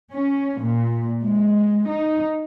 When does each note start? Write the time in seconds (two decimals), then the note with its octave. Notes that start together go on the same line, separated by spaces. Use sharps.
0.11 C#4
0.63 A#2
1.23 G#3
1.88 D#4